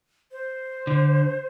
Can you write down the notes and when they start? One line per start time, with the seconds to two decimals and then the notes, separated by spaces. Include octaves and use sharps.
0.32 C5
0.87 D3